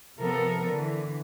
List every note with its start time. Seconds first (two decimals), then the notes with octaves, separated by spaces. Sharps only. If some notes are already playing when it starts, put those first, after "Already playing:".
0.18 C3 F3 B3 A4 A#4
0.68 D3 E3